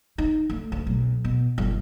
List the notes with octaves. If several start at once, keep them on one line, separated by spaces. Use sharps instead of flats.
D#4
D2
D2
B1
B2
G1